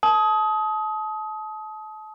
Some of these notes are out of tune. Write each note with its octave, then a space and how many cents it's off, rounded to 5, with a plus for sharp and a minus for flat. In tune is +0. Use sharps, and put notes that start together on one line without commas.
A5 -30 D#6 +25